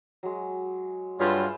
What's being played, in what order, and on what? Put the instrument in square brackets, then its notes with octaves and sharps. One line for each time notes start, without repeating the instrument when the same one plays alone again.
[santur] F#3 G#3
[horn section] G2 G3 F4 [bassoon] F#3 [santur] G#4 B4 E5